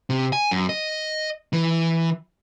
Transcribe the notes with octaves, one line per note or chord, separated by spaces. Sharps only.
C3
G#5
F#2
D#5
E3